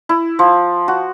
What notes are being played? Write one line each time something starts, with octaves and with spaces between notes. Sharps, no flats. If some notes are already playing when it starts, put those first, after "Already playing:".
E4
F3
F#4